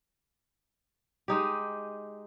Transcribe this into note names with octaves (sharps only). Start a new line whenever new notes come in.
G#3 D#4 G4